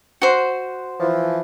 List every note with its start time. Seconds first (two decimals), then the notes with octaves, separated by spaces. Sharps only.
0.22 F#4 C5
1.00 E3 F3